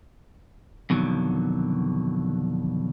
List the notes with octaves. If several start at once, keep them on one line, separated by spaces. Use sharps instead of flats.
F2 B2 D3 D#3 F#3